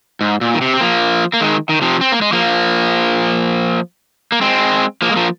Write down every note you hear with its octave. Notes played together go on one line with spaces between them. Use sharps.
G#2
A#2
D#3
C3
C4
F3 A#3
A#3
D#3 G#3
D#3
C3 F3
C4
A#3
G#3
F3 A#3
A#3
G#3 C4
F3 A#3
G#3
F3 A#3